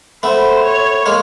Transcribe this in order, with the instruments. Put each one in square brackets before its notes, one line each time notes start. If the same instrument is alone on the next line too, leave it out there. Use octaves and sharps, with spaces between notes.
[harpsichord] A3 B3 [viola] C5
[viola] C#5
[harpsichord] G#3 A#3